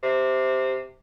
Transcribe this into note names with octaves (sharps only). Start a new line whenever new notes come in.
C3